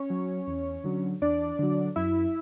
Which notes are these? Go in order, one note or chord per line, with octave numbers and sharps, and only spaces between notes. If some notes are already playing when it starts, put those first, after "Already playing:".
Already playing: C#4 C#5
F#3
E2
D3 F#3
E2 D4 D5
D3 F#3
F#2 E4 E5